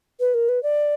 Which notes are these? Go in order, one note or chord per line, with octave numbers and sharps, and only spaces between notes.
B4
A#4
B4
D5